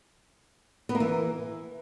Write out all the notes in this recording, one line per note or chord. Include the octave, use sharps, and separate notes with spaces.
B3
A#3
E3